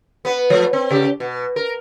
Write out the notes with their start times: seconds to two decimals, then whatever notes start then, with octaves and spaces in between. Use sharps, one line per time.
0.25 B3 B4
0.50 F3 A3
0.73 C4
0.91 C#3 G4
1.20 B2
1.56 A#4